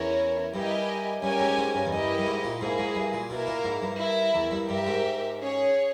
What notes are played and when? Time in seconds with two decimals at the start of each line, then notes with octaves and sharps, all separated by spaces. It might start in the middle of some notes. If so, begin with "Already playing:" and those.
Already playing: E2 C#4 E4 A#4 C#5
0.53 G2 E4 G4 A#4 D#5 G#5
1.22 G2 C#4 G4 A#4 C#5 G#5
1.40 G#2
1.57 G#2
1.74 G2
1.86 E2
1.92 G2 E4 G4 A#4 D#5
2.18 G2
2.27 G#2
2.44 A#2
2.61 G#2 A#3 E4 G#4
2.78 G#2
2.95 G2
3.13 A#2
3.30 B2 A#3 E4 A#4
3.47 A#2
3.64 G#2
3.82 G2
3.99 E4 A#4 E5
4.35 E2
4.51 G2
4.68 G2 G4 A#4 E5
4.87 G#2
5.38 C#4 G#4 C#5